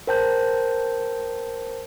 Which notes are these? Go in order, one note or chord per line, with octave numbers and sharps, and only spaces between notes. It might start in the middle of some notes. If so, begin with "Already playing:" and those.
A#4 C5 G5 A5 G6